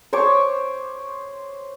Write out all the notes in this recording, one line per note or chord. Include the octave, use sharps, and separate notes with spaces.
C5 C#5 C#6 D6